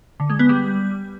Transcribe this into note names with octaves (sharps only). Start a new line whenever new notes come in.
D3
G#3
B3
G3